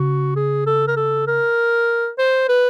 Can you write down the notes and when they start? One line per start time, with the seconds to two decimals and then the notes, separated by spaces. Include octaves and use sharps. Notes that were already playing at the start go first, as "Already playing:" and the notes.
Already playing: C#3 F#4
0.36 G#4
0.66 A4
0.87 A#4
0.97 A4
1.27 A#4
2.18 C5
2.48 B4